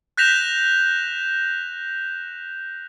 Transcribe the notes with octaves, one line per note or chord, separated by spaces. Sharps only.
F#6 G6 A#6 B6 E7 F7